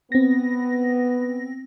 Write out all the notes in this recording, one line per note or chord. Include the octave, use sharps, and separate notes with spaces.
B3 C4 A#6